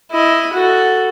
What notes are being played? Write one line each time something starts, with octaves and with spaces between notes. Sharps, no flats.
E4 D#5
F#4 A4